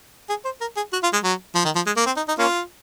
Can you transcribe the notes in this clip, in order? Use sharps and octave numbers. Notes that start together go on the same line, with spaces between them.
G#4
C5
A#4
G#4
F#4
F4
G#3
F#3
F3
D#3
F3
G#3
A#3
C4
D#4
D#4
A#3 C#4 F4